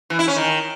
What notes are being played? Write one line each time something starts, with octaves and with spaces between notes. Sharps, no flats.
E3
E4
C#4
D#3